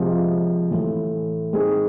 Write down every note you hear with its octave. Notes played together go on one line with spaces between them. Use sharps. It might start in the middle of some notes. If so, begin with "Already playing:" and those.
Already playing: C3 F3 G#3
A2 E3 A3
G#3 C4 D#4 G#4